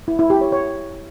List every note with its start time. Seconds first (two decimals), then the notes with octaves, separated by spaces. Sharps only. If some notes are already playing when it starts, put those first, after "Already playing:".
0.08 E4
0.19 E4
0.30 G4
0.41 C#5
0.52 C#5